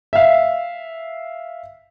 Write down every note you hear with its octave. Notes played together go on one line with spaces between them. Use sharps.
E5 F5